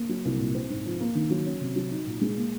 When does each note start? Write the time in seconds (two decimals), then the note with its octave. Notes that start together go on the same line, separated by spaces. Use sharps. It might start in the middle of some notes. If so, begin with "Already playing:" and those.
Already playing: A#3
0.09 F#3
0.25 C2
0.39 A#2
0.55 C4
0.70 G#2
0.85 F3
1.00 A#3
1.15 D#3
1.30 F#3
1.46 C#4
1.61 C3
1.76 F#3
1.91 D#4
2.06 A#2
2.21 G#3
2.36 A#3